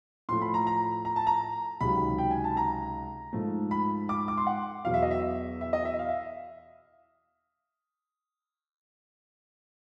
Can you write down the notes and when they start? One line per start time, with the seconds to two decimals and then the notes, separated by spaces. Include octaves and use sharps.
0.29 A2 F3 A3 C6
0.42 B5
0.54 A#5
0.67 A#5
1.05 A#5
1.16 A5
1.27 A#5
1.81 C#2 C3 D#3 F#3 B5
2.18 G5
2.31 G#5
2.44 A5
2.57 A#5
3.33 G#2 F3 A3
3.71 B5
4.09 D6
4.28 D6
4.37 C6
4.47 F#5
4.85 E2 B2 F#3 F5
4.94 E5
5.03 D#5
5.11 E5
5.61 E5
5.73 D#5
5.85 E5
5.99 F5
6.09 E5